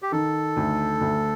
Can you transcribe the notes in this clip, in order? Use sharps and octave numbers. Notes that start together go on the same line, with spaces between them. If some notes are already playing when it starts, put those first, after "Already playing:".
G4
D#3 A4
D2
D2